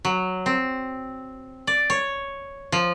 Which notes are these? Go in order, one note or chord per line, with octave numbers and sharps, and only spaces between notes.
F#3
C4
D5
C#5
F3